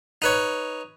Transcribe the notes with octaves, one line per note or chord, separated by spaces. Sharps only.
D#4 B4 C#5